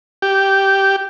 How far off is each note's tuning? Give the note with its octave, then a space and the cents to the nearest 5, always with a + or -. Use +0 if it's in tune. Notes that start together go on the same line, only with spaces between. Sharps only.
G4 -5